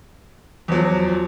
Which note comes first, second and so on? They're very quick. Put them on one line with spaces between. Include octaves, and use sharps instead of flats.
E2 F#3 F3